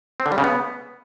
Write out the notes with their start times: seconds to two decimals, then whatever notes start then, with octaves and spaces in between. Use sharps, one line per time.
0.20 C4
0.26 D3
0.32 G3
0.38 C#3
0.44 B3